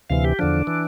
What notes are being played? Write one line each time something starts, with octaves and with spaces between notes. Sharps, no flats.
D2 C3 E3 F5
G4
E2 D3 F3 D4
E3